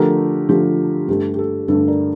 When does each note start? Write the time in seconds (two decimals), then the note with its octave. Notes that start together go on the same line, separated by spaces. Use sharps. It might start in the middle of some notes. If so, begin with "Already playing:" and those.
Already playing: D3 F3 A3 G4 A#4
0.49 D3 F3 A3 G4
1.08 G2 D3 A3 D4 G4
1.34 G4
1.39 A4
1.68 G2 D3 A3 D4 A4
1.88 A#4 D5